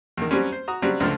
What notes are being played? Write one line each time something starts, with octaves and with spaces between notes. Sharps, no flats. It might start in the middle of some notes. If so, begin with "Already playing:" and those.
E2 D#3
F#3 G3 C4 C#4
C5
F#4 A#5 D#6
C#3 F#3 G3 C4 D4
C#2 D3 F3 A3